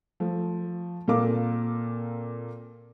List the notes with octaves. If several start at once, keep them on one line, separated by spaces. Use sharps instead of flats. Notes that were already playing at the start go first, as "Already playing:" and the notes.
F3 A3
A#2 C4 A4 A#4 F5 D6